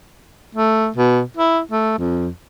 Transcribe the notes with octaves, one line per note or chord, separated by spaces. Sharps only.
A3
B2
E4
A3
F2